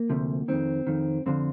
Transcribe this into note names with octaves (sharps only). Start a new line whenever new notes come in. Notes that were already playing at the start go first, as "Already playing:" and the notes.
Already playing: A#3
D2 C3 F3
F2 D#3 C4
F2 D#3
F2 D3 F3 C4